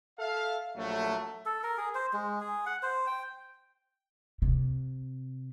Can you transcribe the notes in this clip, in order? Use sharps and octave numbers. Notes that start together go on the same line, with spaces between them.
A4 E5 F5
A#1 F#3 A3
A4
A#4
G#4
C5
G#3
G#4
F#5
C5
G5
C3